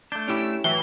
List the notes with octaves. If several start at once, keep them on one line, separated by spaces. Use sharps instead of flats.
A3 D4 G6
C#4 E4 G4 E6 D7
A2 E3 F#3 G7